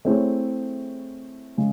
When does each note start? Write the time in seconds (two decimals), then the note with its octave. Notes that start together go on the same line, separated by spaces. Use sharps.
0.05 A3 C4 E4 G#4 C#5
1.58 C#3 G#3